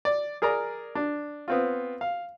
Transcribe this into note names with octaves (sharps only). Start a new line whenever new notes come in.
D5
G#4 A#4 D5 A#5
D4
B3 C4 F4
F5